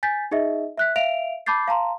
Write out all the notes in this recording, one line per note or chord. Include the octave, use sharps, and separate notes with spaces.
G#5 G6 A6 B6
D#4 G#4 D#5 E5
E5 F#6 B6
E5 F5 D7 F7
A5 B5 D6 G6 A6 C7
F5 A5 A#5 C6